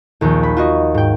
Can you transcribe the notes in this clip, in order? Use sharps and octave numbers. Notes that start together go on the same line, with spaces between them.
A#1 D#2
B5
F4 F#4 D#5
G#2 G5